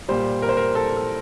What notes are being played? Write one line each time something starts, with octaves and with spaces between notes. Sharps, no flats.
A#2 G3 C5
A#4
C5
A#4
A4
A4